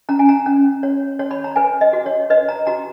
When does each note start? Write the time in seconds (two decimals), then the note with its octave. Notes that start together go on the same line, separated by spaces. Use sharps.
0.09 C#4 A#5
0.19 G#5
0.29 A#5
0.46 C#4
0.83 C#5
1.19 C#5
1.31 B5
1.44 A#5
1.56 B4 G#5
1.81 D#5
1.93 F#4
2.06 C#5
2.30 B4 D#5
2.48 A#5
2.67 F#4 A#5